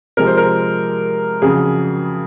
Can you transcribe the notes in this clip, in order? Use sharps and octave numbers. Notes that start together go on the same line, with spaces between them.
C3 F3 G#3 A#4
C5
A#4
F2 C#3 F#3 G#4